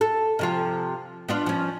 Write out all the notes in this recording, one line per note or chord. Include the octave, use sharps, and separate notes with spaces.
A4
C3 F3 F4
B3 D4 F4
F3 C#4